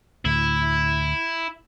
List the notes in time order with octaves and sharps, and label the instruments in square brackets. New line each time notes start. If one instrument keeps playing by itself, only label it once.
[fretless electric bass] D2 A2 [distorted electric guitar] E4